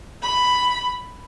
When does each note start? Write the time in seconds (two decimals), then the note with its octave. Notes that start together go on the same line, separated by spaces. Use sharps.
0.22 B5